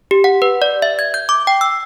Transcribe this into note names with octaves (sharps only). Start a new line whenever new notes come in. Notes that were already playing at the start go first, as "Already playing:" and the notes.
G4
F#5
B4
D5
E5
G#6
G6
D6
G5
E6